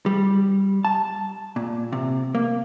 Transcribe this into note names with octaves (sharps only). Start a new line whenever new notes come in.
G3
A5
A#2
C3
A#3